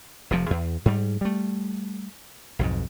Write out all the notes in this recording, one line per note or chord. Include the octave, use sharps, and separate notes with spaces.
F1 C3 F3
E2
G#2 G3
G3 A3
B1 F2 G#2